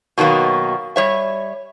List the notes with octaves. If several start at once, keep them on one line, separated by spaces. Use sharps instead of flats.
B2 D#3 F#3 A#3 B3
G3 C#5 E5